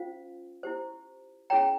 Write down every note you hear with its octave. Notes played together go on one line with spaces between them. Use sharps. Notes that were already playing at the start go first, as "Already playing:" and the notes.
Already playing: C#4 F4 C5 F5
E4 G4 C5
C#4 E4 G#4 C#5 G5 A#5